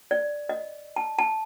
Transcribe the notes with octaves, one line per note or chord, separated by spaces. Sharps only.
D5
D#5
A5
A5